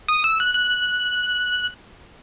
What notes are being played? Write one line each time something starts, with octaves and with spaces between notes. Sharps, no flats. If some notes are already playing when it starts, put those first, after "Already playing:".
D#6
E6
F#6
F#6